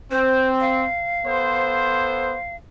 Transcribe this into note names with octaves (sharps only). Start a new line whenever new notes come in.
C4 C5
F5
B3 A4 C5